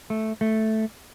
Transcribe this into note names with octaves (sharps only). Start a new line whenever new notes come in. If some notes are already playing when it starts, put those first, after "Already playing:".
A3
A3